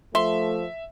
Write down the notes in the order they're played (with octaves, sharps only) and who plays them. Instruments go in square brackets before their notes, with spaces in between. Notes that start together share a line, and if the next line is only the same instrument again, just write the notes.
[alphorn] F3 [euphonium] A3 [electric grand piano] E5 [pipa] C6